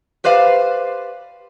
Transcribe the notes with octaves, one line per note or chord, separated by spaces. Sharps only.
G4 B4 C5 D5 F5